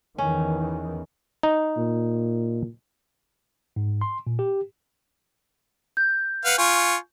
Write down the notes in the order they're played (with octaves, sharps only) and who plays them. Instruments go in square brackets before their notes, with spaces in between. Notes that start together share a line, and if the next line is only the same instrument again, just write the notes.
[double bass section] E2 D#3 E3 [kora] C#4
[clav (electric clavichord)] D#4
[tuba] A#2
[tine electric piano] G#2
C6
A#2
G4
[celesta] G6
[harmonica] B4 F5 F#5
F4 G#5 C#6